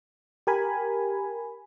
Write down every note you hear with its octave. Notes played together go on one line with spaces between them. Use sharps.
G4 A#4 G#5 B5